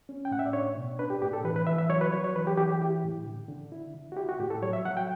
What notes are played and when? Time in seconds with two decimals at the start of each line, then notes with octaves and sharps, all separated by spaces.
0.09 C#4
0.25 G5
0.31 A2 F#5
0.39 E5
0.46 D5
0.53 D4 C#5
0.77 B2
0.99 D4 B4
1.10 G4
1.22 A2 G4
1.33 A4
1.44 E3 B4
1.56 B4
1.67 E3 E5
1.78 E5
1.90 F#3 C#5
2.01 B4
2.12 F#3 C#5
2.24 C#5
2.36 E3 B4
2.47 G4
2.57 E3 G4
2.69 G4
2.81 E4 G4
3.04 A2
3.26 D3
3.48 D3
3.72 E4
3.95 D3
4.12 F#4
4.17 E4 G4
4.29 F#4
4.39 A2 G4
4.50 A4
4.62 F#3 C#5
4.73 E5
4.85 F#3 F#5
4.97 G5